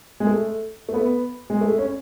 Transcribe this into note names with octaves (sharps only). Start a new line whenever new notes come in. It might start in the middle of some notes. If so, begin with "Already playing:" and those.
G#3
A3
A3
B3
G#3
A3
C#4